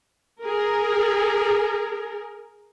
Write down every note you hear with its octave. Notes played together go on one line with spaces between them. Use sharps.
G#4 A#4